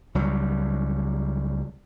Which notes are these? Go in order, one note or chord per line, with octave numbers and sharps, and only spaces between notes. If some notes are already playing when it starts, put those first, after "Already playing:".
C#2 F#3 G3